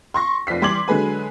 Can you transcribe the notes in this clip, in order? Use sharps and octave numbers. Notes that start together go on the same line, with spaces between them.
C6 C#6 A#6
F1 F3 D5 B6 C7
E3 G3 C6 D6 G#6 F#7
D3 F#3 G#3 B4 G#5